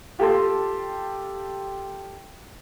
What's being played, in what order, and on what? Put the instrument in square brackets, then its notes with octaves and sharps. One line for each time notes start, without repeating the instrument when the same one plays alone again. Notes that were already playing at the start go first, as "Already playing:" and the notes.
[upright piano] F4 G4 A4 G5 A5 C6